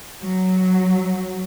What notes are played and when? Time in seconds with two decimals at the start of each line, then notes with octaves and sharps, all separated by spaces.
0.23 F#3